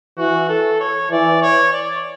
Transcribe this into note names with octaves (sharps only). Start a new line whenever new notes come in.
E3 F#4
A4
C#5
E3 D5
C#5
D5